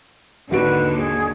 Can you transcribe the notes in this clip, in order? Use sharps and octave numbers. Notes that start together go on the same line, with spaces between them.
G#1 D#2 D3 F#4 B4 D7
G#4